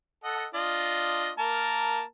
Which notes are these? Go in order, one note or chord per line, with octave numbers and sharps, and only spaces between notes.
A4 D#5 F#5
D4 F4 D#5
A#3 A#4 A5